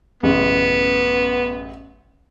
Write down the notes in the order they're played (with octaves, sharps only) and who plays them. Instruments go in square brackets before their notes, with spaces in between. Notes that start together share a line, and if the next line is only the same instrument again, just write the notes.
[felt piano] A1 F#2 C#3 [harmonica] B3